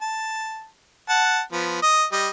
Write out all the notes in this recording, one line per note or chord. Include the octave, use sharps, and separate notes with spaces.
A5
F#5 A5
F3 B3
D#5 D#6
G3 D#5